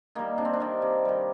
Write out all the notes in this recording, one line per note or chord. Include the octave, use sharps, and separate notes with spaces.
D#3 G3 A#3
C3 D4
C4
D4
D#3 G3
C3
D#3 G3